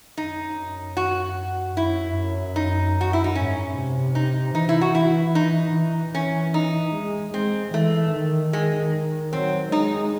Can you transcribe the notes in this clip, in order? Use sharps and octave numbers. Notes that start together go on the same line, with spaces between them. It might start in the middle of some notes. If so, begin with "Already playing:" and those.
F#2 D#4
F#4
F#2 E4
F#2
D#4
F#4
E4
D#4
G#2 C#4
C3
D#4
E3 D#4
E4
F#4
E3 E4
D#4
E3
E3 C#4
D#4
G#3
G#3 C4
E3 A3
D#3
G#3
F#3 C4
G#3 D#4